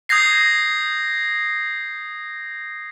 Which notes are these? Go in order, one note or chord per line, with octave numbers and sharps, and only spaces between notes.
D#6 G6 G#6 A#6 C7